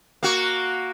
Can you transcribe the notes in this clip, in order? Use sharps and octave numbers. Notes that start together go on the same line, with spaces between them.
A#3 F#4